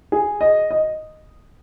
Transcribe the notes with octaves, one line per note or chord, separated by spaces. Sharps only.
G#4
D#5
D#5